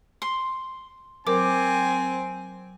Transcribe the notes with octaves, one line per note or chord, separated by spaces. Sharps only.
C6
F#3 C4 A#4 G#5 D6